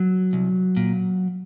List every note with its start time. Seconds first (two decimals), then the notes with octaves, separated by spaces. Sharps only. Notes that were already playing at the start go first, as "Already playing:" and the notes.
Already playing: F#3
0.33 C2
0.77 A#2